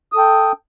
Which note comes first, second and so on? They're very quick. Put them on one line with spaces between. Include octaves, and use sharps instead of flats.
D#6 A4 G5